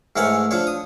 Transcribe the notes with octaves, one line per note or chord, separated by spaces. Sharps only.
G#2 E3 A3 A#4 C#5 F#5
F3 D4 C#5
D#6